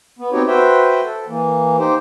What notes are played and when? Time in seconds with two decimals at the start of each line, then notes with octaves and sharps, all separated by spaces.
0.19 B3
0.32 B3 C4 D#4 F#4 G4 C#5
0.48 F#4 B4 C5 E5 G5
1.04 A4
1.28 E3 A#3
1.78 D#4 G4 C5